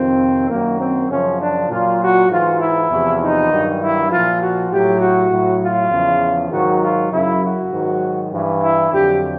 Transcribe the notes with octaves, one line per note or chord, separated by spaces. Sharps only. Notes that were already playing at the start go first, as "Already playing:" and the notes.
Already playing: F2 C3 D#3 C4
F#2 D#3 F#3 A#3
C4
F#2 C#3 F3 C#4
D4
A#2 F#3 F4
F#4
G#2 E3 F4
E4
E2 C3 F3
D#4
G2 D#3 F#3
E4
A#2 F3 F4
F#4
A2 F#3 G4
F#4
A2 F#3
F4
E2 C#3 F3
G#2 D#3 F#3 F#4
F4
F#2 C#3 F#3 E4
F#4
G#2 D#3 F#3
G2 E3
E4
F2 D3 F#3 G4